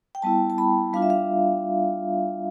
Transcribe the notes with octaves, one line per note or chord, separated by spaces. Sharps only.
G5
G3 B3 E4 A5
A5
B5
G3 D4 F4 F5
E5
F5